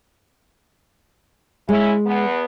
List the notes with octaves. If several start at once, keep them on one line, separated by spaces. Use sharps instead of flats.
C#3 G#3 C#4 E4
E2 B3